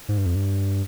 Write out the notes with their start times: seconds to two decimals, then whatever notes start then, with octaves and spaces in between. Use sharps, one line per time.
0.09 G#2
0.18 G2
0.26 F2
0.35 G2